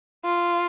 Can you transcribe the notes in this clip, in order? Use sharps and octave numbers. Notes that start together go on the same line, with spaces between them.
F4